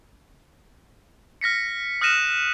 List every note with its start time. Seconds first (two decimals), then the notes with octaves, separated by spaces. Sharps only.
1.41 F6 A#6 B6 C#7
2.01 D#6 F6 F#6 A#6 D#7 E7